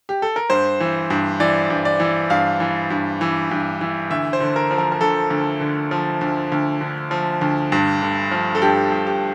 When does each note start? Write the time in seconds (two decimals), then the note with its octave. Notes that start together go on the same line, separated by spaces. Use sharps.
0.09 G4
0.22 A4
0.36 A#4
0.50 G2 C5
0.80 E3
1.10 G2
1.40 E3 D5
1.70 G2
1.85 D5
2.00 E3
2.30 G2 F5
2.60 E3
2.90 G2
3.21 E3
3.51 G2
3.81 E3
4.10 D2 E5
4.33 C5
4.41 D3
4.56 A#4
4.71 F3
4.78 A#4
4.92 A#4
5.01 D2 A4
5.30 D2
5.61 D3
5.91 F3
6.21 D2
6.52 D2
6.81 D3
7.11 F3
7.41 D2
7.72 G2
8.02 D3
8.31 F3
8.55 A4
8.62 G2 G4
8.92 G2
9.07 G4